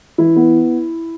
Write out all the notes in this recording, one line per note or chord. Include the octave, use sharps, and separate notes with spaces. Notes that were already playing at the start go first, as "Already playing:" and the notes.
E3 E4
B3